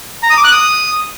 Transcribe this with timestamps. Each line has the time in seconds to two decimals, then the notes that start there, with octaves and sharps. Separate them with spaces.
0.23 A#5
0.30 D#6
0.37 D6
0.44 F#6
0.51 D#6